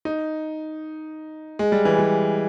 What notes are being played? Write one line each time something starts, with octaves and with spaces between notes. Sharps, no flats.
D#4
G#3
G3
E3
G3